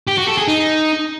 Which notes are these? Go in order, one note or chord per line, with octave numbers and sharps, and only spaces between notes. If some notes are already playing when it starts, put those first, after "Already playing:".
G4
F#4
A4
G#4
D#4